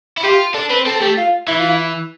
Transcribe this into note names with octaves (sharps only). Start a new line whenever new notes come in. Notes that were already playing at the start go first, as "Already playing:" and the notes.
E4
F4 G4
D4 A4
C4 B4
C4 A4
A4
A3 G4
F4
E3 E4
F4
E4